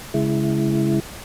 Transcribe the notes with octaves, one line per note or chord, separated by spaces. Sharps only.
C#3 G#3 E4